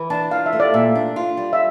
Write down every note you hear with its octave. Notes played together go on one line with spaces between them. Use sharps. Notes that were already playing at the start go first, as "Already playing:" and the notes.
Already playing: E3
D4 A5
F4 F5
E5
A3
D5
A#2 E5
D4
F4
G3
E5